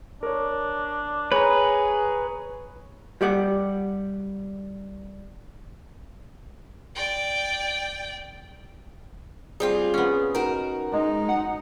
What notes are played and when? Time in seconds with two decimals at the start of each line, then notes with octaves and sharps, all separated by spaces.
0.23 D4 A#4 C#5
1.32 G#4 B4 C#5 A#5
3.21 G3 G4 D5 F#5
6.95 D5 G5
9.60 G3 C4 F4 G#4
9.94 B3 C#4
10.35 D#4 F#4 A#4
10.93 G#3 D#4
11.29 F#5